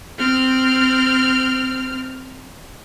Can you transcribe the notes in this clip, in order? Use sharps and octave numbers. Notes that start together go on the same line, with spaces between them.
C4 F6